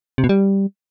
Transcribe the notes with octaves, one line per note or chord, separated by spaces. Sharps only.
C3
B2
G3